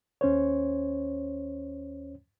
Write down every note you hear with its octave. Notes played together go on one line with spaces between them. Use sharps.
D#2 C#4 C5 C#5